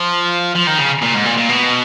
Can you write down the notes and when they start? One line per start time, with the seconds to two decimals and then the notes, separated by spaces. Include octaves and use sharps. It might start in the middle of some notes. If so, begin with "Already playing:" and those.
Already playing: F3
0.55 F3
0.67 D#3
0.78 C#3
1.02 A#2
1.14 G#2
1.25 A#2
1.37 A#2
1.49 B2